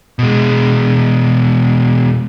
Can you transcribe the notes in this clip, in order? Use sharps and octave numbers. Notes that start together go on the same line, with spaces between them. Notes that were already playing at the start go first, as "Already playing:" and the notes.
B2 G#3